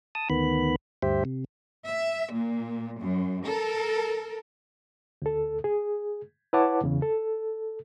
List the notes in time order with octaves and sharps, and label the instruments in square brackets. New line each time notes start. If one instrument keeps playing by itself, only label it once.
[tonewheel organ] A5 D#6
D2 D#3 B3 B5
D2 G2 G4 C5 E5
C3
[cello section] E5
A#2
F#2
A4 A#4
[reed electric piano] D2 A4
G#4
E4 B4 C#5 F#5 A5 D6
E2 C#3
A4